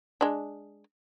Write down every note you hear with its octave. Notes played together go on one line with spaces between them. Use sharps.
G#3 D4